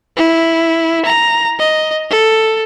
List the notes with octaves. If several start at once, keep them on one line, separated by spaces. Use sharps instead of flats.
E4
A#5
D#5
A4